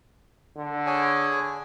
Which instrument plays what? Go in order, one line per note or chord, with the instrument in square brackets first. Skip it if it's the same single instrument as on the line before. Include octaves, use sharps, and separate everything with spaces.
[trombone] D3
[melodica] G#4 C#5 G#5